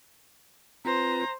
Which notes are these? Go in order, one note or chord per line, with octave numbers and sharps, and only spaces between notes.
C4 F4 B4 C5 A#5